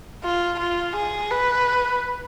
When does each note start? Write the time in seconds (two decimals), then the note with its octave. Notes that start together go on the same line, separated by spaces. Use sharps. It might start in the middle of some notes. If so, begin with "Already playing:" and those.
0.24 F4
0.60 F4
0.96 G#4
1.31 B4